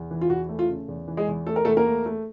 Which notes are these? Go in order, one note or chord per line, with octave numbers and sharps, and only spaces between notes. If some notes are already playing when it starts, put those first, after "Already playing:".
Already playing: E2
E3
F4
E2 F#4
A3
F4
C#3
E2
E3
G#3 G#4
E2
A3 A4
A#4
E2 A3 A4
A#3 A#4
A3
A3